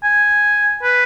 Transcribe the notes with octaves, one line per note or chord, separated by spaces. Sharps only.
G#5
B4